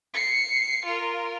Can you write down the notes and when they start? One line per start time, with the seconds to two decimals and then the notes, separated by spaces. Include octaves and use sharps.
0.14 C7 C#7
0.85 F4 A#4